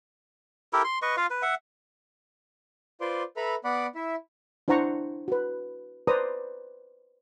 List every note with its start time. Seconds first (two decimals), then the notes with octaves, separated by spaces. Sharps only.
0.73 E4 G4 A4 A#4
0.84 C6
1.02 B4 D#5 C#6
1.17 F4 F5
1.30 B4
1.42 E5 F#5
3.01 F4 B4 C5 D5 C6 D6
3.37 A4 B4 E5 A#5 B5
3.65 B3 D5 F#5 B5 D6
3.95 E4 E5
4.68 D4 E4 C5 F#5 A#5 C#6
5.28 F#4 B4
6.07 B4 C5 D5 A#5 D#6